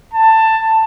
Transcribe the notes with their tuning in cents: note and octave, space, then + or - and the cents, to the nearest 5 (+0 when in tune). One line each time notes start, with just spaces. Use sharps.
A5 +15